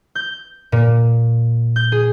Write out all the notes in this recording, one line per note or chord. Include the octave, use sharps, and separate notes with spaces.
G6
A#2
G6
G#4